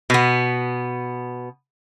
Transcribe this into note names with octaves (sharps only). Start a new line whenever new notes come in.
B2 B3